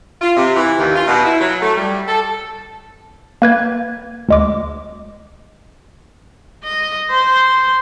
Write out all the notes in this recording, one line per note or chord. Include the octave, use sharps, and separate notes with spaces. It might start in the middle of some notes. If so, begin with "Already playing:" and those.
F4
C3
E3
D#2
F4
B2
E4
F#3
A3
G3
A4
A#3 B4 G#6
D2 G#3 D6
D#5
C5